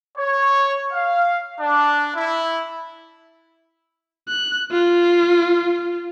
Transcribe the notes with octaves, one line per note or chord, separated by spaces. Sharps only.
C#5
F5
D4
E4
F#6
F4